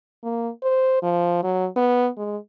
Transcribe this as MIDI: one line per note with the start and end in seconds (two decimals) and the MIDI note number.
0.24 0.49 58
0.63 0.99 72
1.03 1.42 53
1.43 1.67 54
1.77 2.09 59
2.17 2.37 56